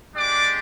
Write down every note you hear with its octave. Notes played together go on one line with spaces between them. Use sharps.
G#3 D4 G4 D5 D6